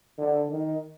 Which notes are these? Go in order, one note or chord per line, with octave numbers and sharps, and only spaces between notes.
D3
D#3